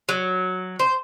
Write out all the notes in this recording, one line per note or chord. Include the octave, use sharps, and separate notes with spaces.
F#3
C5